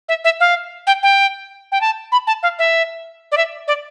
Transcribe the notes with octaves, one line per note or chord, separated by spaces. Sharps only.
E5
E5
F5
G5
G5
G5
A5
B5
A5
F5
E5
D5
E5
D5